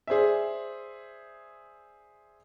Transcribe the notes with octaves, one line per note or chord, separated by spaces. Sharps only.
G#4 C5 D5 E5